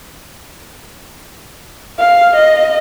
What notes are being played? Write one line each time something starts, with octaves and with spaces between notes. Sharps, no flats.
F5
D#5